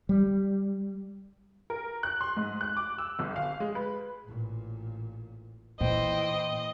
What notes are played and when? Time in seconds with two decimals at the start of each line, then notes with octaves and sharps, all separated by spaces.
0.09 G3
1.70 A#4
2.03 F#6
2.21 C6
2.37 G#2
2.61 F#6
2.77 D6
2.98 E6
3.19 G1
3.36 F5
3.60 G#3
3.75 B4
4.25 A1 A#2
5.81 A#2 E3 C5 D#5 G5